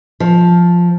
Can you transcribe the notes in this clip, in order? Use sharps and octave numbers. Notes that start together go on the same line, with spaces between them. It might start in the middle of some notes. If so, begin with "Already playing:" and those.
F3